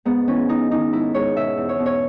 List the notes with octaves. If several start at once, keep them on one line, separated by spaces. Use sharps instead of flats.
G#2 B3
E3 C#4
E3 D#4
D#3 D#4
G#2 E4
G#2 C#5
B2 E5
E2
C#5
B2
C#5